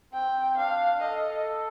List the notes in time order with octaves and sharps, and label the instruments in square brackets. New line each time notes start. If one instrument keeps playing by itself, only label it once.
[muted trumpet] C4 [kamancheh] G5
[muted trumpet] D4 [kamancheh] F5
[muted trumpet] A4 [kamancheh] D#5